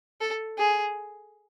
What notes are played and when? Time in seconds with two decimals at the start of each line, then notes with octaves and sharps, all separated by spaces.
0.21 A4
0.58 G#4